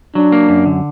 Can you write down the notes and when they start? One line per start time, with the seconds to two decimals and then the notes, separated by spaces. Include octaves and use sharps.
0.15 F#3 D4
0.32 A#3
0.49 F#2
0.66 D3